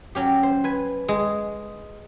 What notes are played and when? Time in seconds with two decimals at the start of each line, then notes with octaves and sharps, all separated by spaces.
0.15 F#3 C#4 G4
0.43 C5
0.64 B4 G#5
1.08 G#3